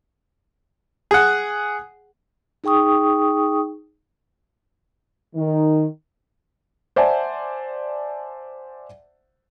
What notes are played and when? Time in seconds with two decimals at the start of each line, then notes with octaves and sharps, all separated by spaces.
1.11 G#4 F#5
2.64 D#4 G#4 G5 C#6 D#6
5.36 D#3
6.96 C5 D5 E5 F#5 G#5 A5